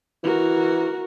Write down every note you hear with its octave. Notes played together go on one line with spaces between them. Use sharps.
E3 F#4 A#4